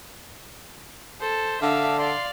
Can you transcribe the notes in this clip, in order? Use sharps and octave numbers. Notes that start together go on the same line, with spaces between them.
A4 C5
D3 D4 E5 F5
D5 F5 C6